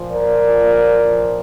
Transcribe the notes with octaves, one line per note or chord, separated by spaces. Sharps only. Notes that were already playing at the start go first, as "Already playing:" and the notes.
Already playing: A#2 F3
A#4 D5
A#2 F3
A#2 F3